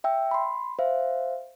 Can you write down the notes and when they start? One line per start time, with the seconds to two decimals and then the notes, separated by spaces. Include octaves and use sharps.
0.04 E5 G5 E6
0.31 B5 C6
0.79 C5 E5 F5